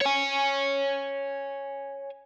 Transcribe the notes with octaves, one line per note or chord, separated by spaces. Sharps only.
C#5 G#5